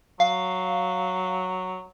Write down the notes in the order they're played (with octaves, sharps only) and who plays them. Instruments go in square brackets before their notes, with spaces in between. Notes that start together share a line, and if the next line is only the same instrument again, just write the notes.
[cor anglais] F#3 [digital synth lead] F5